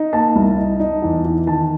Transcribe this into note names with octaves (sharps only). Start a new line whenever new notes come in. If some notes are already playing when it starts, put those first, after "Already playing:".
Already playing: D#4
A#3 A5
C2
D#4
D#4
E2
E3
D#3 A5